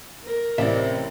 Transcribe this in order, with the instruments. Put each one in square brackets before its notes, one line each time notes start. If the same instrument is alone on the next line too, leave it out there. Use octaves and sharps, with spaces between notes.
[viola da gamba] A#4
[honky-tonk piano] A1 E4 [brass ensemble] C3 [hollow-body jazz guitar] D5 E5